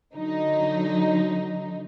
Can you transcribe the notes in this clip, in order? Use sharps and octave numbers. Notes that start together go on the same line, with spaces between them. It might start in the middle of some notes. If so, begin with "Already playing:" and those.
D3 F#3 D#4